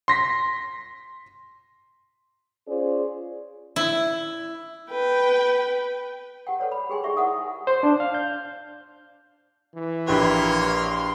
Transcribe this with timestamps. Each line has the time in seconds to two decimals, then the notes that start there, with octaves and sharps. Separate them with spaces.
0.08 C6 A#6 B6
2.67 C#4 F4 G#4 C5 D5
3.76 E4
4.90 B4 G5
6.47 G4 F#5 G5
6.59 A4 B4 C#5 D5 F#5
6.72 B5
6.90 G4 G#4 G5 G#5 C6
7.04 D#4 G4 G#4 D5 E5 C#6
7.17 E4 A#4 F#5 G#5 D#6
7.67 C5
7.83 D4
8.00 F5
8.14 G6
9.75 E3
10.08 A#1 A#3 G4 B4 C#5 C6